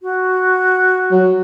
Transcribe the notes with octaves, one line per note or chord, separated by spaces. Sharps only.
F#4
F#3